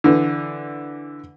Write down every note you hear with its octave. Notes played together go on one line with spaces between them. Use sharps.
D3 E3